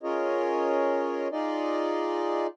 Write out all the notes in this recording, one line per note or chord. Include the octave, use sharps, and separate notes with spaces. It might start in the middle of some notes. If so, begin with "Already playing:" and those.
C#4 F4 G#4 A#4 C#5 D#5
D#4 F4 G#4 D5 D#5